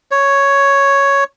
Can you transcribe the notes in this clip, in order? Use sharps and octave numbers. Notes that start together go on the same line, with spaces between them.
C#5